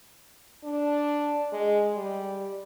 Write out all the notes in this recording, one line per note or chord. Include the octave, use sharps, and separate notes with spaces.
D4
G#3
G3